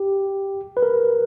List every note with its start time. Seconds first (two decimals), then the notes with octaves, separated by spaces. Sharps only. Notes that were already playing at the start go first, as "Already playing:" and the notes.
Already playing: G4
0.77 B4
0.83 A#4